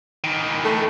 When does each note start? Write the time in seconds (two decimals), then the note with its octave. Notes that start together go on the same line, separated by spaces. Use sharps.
0.24 D#3 E3
0.64 A3